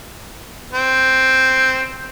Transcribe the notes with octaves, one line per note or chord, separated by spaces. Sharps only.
C4